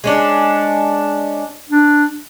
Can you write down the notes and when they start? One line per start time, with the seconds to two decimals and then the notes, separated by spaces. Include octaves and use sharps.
0.04 G#3 C#4 D4
1.69 D4